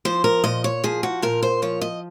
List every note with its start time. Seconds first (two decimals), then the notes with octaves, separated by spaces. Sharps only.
0.05 F3 C5
0.24 A#4
0.44 A#2 D#5
0.64 C#5
0.84 F3 G#4
1.03 F#4
1.22 A#2 A#4
1.43 C5
1.62 F3 C#5
1.81 D#5